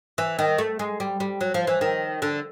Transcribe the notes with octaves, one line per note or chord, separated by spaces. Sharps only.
E3
D#3
A3
G#3
G3
G3
F#3
F3
E3
D#3
D3